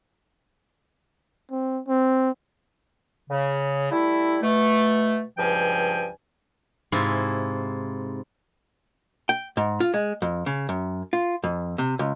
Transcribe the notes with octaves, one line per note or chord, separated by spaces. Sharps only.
C4
C4
C#3
G3 A3 E4
B2 A3
C#2 G2 F3 G5 G#5
G#2 C3 E4 F4
G5
G#2
F4
G#3
F2
C#3
F#2
F4
F2
C3
C#2